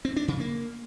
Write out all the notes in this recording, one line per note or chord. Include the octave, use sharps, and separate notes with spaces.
C4
D4
C#3
A#3